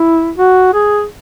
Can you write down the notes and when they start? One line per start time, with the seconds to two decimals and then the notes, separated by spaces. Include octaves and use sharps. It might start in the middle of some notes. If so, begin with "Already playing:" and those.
Already playing: E4
0.38 F#4
0.74 G#4